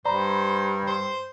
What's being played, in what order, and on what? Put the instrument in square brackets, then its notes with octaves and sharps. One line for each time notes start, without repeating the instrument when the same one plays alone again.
[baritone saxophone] G2 [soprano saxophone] C5 [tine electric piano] D5 A#5 B5
[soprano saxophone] C5